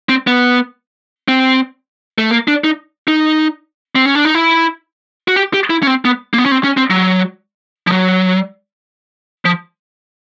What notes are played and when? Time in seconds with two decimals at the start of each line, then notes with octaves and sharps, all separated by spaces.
0.09 C4
0.27 B3
1.28 C4
2.18 A3
2.31 A#3
2.48 D4
2.64 D#4
3.08 D#4
3.96 C4
4.06 C#4
4.15 D4
4.25 D#4
4.35 E4
5.28 F#4
5.36 G4
5.54 G4
5.70 E4
5.83 C#4
5.87 C4
6.05 B3
6.34 A#3
6.38 B3
6.46 C#4
6.52 C4
6.64 C#4
6.77 C4
6.90 F#3
7.87 F3
7.92 F#3
9.45 F3